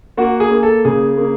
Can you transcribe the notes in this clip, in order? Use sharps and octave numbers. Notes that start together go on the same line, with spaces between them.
A#3 F#4
G#4
A#3
A4
C#3 G#4
A#3